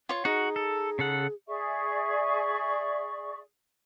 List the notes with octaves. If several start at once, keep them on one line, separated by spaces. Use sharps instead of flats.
F4 C#5
D#4 F#4 G#4
A4
C#3 A4 F#5
G#4 D5 E5 C#6